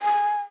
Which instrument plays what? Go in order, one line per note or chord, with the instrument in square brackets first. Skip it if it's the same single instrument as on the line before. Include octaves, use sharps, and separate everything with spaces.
[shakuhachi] G#5